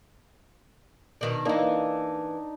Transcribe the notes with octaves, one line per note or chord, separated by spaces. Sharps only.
B2 D#3 D4
E3 A#3 D4 D#4